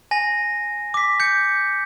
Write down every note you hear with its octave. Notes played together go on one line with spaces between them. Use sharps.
G#5 A#6
D6 B6
G6 C#7